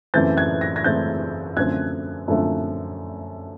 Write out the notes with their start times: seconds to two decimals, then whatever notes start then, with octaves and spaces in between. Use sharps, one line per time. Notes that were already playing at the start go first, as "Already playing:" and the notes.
0.14 F#2 C#3 E3 A3 C4 G6 A6
0.37 F#6 G#6
0.61 A#6
0.76 G#6 A#6
0.84 F#2 C#3 E3 A3 C4 G6 A6
1.57 F#2 D3 F3 A3 C4 F#6 G#6
2.28 F#2 D3 F3 A3 C4